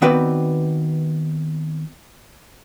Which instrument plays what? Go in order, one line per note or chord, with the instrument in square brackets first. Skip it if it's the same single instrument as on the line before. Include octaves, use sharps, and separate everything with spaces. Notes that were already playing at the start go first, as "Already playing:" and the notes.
[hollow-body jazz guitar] D#3 B3 C4 F#4 B4 D5